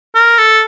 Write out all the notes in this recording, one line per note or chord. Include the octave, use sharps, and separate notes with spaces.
A#4
A4